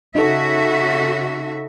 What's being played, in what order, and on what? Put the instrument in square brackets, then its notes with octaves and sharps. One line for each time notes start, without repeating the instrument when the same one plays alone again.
[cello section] C#3 F#4 E5 [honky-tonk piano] D#4 A4